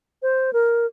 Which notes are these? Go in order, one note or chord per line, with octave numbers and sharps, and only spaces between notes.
C5
A#4